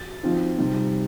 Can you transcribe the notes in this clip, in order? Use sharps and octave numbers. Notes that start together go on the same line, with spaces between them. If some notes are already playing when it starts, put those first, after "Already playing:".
Already playing: A6
F3 C4 D#4
C3 G3 C4 D#4